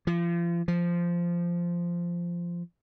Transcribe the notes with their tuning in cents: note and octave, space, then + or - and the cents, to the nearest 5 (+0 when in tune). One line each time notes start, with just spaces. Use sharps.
F3 -35
F3 -10